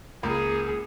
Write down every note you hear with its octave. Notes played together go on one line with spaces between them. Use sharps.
C#2 A#3 G#4 B5